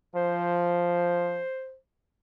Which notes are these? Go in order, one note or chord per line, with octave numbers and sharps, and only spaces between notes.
F3 C5